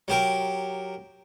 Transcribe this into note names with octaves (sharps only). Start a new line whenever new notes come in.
F#3 G4 A#4